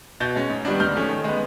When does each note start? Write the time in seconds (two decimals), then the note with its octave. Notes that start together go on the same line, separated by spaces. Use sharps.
0.20 B2 G6 A6
0.36 G#3 C#4
0.50 G#2
0.65 D#3 G3 B3 D4
0.80 G#2 F6 G6
0.95 F3 A3 C#4
1.09 D#3
1.24 G#3 B3